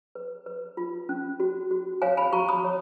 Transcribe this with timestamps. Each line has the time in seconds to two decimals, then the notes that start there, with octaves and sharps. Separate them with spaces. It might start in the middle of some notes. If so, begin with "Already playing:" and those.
0.15 B4
0.46 B4
0.77 F4
1.09 C#4
1.40 F#4
1.71 F#4
2.02 C#5 F5 G#5
2.17 G#5 B5
2.33 F#4 A#5 C#6
2.49 B5 D#6
2.64 C#5